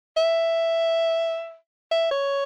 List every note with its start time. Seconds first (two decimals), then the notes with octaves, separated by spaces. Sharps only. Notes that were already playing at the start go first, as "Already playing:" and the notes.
0.17 E5
1.91 E5
2.11 C#5